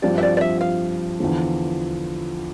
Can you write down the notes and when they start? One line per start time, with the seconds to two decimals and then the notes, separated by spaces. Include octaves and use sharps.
0.02 G2 F3 C4 G4 D5
0.18 E5
0.23 D5
0.37 D5
0.41 E5
0.61 F5
1.20 E2 D3 F3